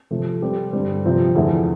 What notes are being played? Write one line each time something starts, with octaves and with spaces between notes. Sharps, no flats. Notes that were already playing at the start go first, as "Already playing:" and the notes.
C3 F3 A3
G3 C4 G4 C5
G2 D3 G3 C4
C3 F3 C4 F4
E2 D3 F3 A3 E4